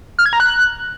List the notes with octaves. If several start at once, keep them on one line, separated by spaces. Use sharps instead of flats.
F6
G#6
A#5
F#6